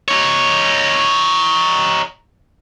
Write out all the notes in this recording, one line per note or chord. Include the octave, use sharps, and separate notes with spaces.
D#4 C#5